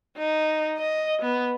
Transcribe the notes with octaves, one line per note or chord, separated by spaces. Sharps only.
D#4
D#5
B3